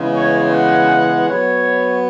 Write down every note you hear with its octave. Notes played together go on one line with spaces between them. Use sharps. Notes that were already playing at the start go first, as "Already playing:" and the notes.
Already playing: C#3 E3 G#3 B3
C#5
F#5
F#3 B3 C#5